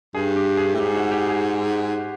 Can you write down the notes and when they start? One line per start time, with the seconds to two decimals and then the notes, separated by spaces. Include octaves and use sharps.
0.15 G2 G#4
0.36 G4
0.57 G#4
0.74 A2
0.80 G#2 G4
0.96 F#4
1.11 G4
1.28 G#4